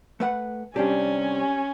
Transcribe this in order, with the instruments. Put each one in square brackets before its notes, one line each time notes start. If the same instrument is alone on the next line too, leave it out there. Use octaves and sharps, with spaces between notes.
[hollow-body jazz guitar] A3 B4 F#5
[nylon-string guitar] C3 G3 D4 [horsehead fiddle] C#4 G#5 [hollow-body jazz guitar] G4